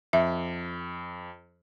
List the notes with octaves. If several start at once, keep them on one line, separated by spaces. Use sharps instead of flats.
F2 E5